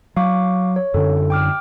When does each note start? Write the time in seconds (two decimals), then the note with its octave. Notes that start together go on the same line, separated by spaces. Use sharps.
0.16 F#3 F5 C#6 D6
0.76 C#5
0.94 F#2 D3 A4
1.30 G5 D6 F6